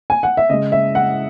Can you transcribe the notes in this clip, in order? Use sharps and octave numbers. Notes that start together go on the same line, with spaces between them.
G#5
F#5
E5
C#3 G#3 D#5
E5
F#5